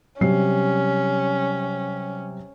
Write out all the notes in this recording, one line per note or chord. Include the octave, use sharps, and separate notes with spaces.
C3 F#3 G3 C#4 C7